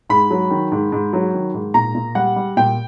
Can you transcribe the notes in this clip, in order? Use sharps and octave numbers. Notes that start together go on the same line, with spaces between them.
G#2 B5
F#3
D#3
G#2
G#2
F#3
D#3
G#2
A#2 A#5
A#2
G3 F#5
G3
A#2 G5